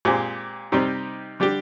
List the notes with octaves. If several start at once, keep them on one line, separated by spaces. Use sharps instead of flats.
A#2 G#3 C4 G4
C3 G3 C4 D#4 G4
D3 G3 D4 G4